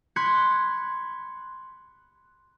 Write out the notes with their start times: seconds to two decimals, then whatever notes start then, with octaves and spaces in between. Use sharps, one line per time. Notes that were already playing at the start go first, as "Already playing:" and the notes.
0.16 B5 C6 F#6 G#6 B6 C#7